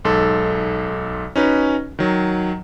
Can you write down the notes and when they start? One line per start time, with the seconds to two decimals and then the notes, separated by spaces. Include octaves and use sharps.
0.05 B1 G#2 A4
1.36 C#4 D#4 F#4 B4
1.99 D#3 F#3